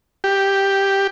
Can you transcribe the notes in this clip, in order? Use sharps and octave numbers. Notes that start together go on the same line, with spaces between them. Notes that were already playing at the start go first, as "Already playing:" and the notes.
G4